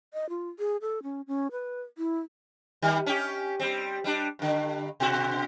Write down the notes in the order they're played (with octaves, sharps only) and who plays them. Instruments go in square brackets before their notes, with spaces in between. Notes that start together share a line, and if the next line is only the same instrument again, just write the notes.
[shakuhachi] D#5
F4
G#4
A4
C#4
C#4
B4
E4
[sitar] D#3 G3
C#4 G4
G3 C4
G3 D4
G2 D3
B2 F#4